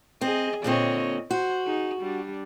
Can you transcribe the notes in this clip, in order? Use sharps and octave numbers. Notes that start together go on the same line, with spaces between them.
C4 G#4 D#5
A#2 D3 C4 C#5 D#5
F#4 C5
D#4 G#4
G3 D4